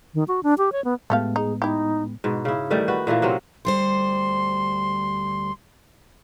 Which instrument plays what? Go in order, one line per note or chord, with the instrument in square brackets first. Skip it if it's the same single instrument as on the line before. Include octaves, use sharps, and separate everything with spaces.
[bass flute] D#3
F#4
D4
G4
C#5
B3
[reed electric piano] A2 G#3 B3 [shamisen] A3 G4 F5
[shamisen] D#4 [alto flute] G#4
[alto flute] D#4 [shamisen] E4 G4
[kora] G#2 B2
C#3 E4
D#3 E3 G3 A3
F#4 B4
A#2 E3 A3 A#3
C3 F#3 C4 C#4
[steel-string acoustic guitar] D2 G3 C5 [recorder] C6